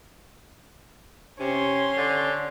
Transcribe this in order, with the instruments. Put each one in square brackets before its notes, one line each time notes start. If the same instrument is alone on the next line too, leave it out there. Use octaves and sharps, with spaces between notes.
[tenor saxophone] C3 [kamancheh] C#4 C6
[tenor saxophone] D3